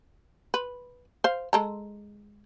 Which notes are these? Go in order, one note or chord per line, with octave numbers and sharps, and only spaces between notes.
B4
C5 F5
G#3 A4 A#5